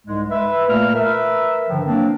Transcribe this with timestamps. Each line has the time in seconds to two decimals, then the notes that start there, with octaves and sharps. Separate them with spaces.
0.07 C2 G#2 G#3
0.30 B4 E5
0.70 A#2 A3 A#3 F6
0.94 A#4 B4 E5
1.69 G2 D3 D#3 F3
1.86 F#3 A#3 C4 D4